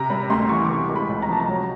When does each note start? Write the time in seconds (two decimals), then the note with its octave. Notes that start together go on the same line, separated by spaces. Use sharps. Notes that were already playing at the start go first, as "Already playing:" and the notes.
Already playing: C3 A#5
0.10 G3 B5
0.30 D2 C6
0.49 E3 C#6
0.65 D6
0.69 C3 C#6
0.89 G#3
0.96 B5
1.09 C#2
1.22 A#5
1.29 F3 A5
1.40 A#5
1.48 F#3